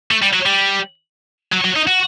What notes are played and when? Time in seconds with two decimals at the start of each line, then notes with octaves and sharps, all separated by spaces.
0.11 A3
0.22 G3
0.34 F#3
0.46 G3
1.53 F#3
1.65 F#3
1.76 D#4
1.87 F#4